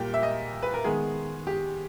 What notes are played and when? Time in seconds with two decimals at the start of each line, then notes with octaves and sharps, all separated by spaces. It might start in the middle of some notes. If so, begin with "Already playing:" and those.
Already playing: A#2 G3 A#3 G5
0.14 E5
0.23 D#5
0.63 B4
0.74 A#4
0.84 D#3 G#3 B3 G#4
1.47 G4